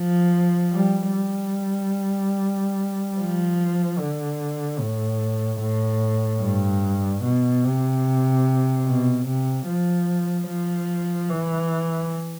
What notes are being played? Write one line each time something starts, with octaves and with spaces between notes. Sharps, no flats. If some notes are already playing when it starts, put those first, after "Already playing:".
Already playing: F3
G3
G3
F3
D3
A2
A2
G2
B2
C3
B2
C3
F3
F3
E3